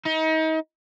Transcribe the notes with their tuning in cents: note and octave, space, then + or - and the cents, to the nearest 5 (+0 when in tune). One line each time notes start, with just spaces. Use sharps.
D#4 +35